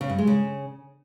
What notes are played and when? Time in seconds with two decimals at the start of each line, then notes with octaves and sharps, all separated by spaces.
0.01 C#3
0.10 G2
0.18 G#3
0.27 C#3